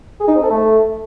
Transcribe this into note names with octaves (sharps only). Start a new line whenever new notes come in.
G#4
D#4
C4
A4
A3